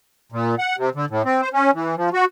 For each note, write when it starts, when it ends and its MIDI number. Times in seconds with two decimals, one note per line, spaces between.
0.32 0.55 46
0.59 0.76 78
0.78 0.90 48
0.95 1.05 50
1.10 1.22 45
1.25 1.41 60
1.42 1.49 72
1.53 1.71 61
1.74 1.95 52
1.97 2.09 53
2.13 2.25 66